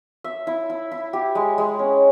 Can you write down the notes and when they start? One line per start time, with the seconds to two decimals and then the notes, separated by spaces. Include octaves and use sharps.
0.24 E5
0.47 E4
0.70 E4
0.91 E4
1.13 G4
1.35 G#3
1.58 G#3
1.79 C#4